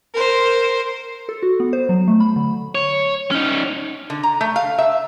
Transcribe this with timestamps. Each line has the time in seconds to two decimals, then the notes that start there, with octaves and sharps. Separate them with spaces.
0.14 A#4 C5
1.29 A4
1.43 F#4
1.60 B3
1.73 C5
1.89 F#3
2.08 A3
2.20 B5
2.36 D3
2.75 C#5
3.31 C#4 D#4
4.10 D3
4.23 A#5
4.41 A3
4.56 F5
4.78 E5